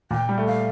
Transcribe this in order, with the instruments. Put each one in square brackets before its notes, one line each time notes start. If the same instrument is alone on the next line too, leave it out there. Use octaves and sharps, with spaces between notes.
[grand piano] A#2 [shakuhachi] G5
[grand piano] G3
A3
[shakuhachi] F5